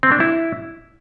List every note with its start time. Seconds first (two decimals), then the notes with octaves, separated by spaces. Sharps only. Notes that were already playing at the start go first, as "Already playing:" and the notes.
0.03 C4
0.12 D4
0.20 E4